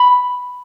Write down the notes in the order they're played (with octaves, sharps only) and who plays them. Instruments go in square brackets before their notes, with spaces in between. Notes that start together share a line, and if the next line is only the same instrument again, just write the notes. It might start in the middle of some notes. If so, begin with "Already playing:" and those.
Already playing: [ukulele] B5